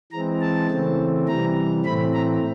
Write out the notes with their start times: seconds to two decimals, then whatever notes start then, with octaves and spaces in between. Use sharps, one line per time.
0.12 E3 G#3 C4 A#5
0.41 A5
0.70 C#3 E3 A3 C4
1.27 C3 E3 G3 A#5
1.85 A2 E3 A3 C4 B5
2.14 A#5